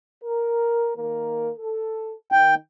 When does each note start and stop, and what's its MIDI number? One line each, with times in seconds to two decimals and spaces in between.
0.23 0.91 70
0.96 1.50 51
0.96 1.50 58
0.96 1.50 70
1.57 2.14 69
2.32 2.55 51
2.32 2.55 79